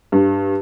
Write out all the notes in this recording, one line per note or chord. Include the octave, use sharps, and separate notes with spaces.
G2